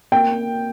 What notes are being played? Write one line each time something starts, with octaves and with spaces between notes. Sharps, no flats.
A#3 G5